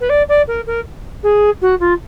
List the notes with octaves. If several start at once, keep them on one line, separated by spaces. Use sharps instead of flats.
B4
D5
D5
A#4
A#4
G#4
F#4
F4